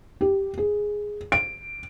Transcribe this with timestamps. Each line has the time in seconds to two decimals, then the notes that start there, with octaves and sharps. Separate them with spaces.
0.21 G4
0.58 G#4
1.32 D7